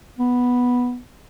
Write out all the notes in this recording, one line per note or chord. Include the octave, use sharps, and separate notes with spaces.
B3